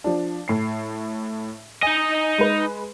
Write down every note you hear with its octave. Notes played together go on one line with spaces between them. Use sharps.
F3 D4
A2 C7
D#4 D#5 G#5
G#3 B4